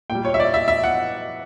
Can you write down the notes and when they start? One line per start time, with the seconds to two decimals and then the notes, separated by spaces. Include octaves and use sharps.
0.10 A#2 G5
0.15 G3
0.25 C#5
0.34 E5
0.40 D5
0.54 E5
0.68 E5
0.84 F#5